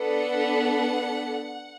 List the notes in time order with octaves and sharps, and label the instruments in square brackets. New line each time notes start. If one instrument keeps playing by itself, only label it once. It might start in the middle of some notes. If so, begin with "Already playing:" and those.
Already playing: [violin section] B3 D4 A4 F#5